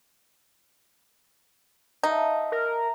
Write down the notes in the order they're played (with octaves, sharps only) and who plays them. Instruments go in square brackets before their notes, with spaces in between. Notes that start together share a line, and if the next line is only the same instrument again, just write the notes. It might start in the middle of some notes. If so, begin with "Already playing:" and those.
[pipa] D#4 [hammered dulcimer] A4 E5 F5
[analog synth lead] A#4